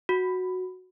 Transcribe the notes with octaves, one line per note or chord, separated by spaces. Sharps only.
F#4